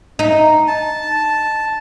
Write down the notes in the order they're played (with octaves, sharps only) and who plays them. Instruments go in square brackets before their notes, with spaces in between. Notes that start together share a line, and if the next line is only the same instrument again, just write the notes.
[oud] D#4
[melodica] A5